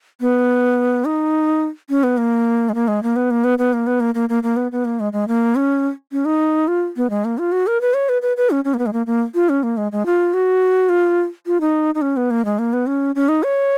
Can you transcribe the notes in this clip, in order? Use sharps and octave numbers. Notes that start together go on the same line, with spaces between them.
B3
D#4
C#4
B3
A#3
G#3
A#3
G#3
A#3
B3
A#3
B3
B3
A#3
B3
A#3
A#3
A#3
A#3
B3
B3
A#3
G#3
G#3
A#3
C#4
C#4
D#4
F4
B3
G#3
A#3
F4
F#4
A#4
B4
C#5
B4
B4
B4
C#4
C#4
A#3
B3
G#3
A#3
A#3
F4
C#4
A#3
G#3
G#3
F4
F#4
F4
F4
D#4
D#4
C#4
B3
A#3
G#3
A#3
B3
C#4
C#4
D#4
C#5